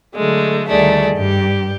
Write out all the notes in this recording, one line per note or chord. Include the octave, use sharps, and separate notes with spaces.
D3 F#3 G#3 A3
D2 D#3 G3 A3 G#4 D5
G2 G4